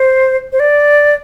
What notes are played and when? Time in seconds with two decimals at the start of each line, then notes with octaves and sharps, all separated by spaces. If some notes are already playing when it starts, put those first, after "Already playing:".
Already playing: C5
0.52 C5
0.60 D5